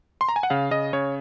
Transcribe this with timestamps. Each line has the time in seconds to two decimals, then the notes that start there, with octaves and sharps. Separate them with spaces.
0.21 C6
0.29 A#5
0.36 G#5
0.43 F#5
0.50 C#3 F5
0.71 C#3 D#5
0.93 C#3 C#5